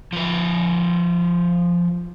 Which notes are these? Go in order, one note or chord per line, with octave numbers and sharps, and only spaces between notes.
F3 B4